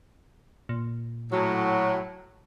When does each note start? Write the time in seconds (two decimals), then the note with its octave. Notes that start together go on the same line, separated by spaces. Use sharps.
0.69 A#2
1.32 A2 F#3